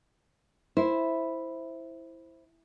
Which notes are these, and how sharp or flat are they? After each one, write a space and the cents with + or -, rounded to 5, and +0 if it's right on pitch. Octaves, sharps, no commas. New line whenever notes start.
E4 +0 C5 +0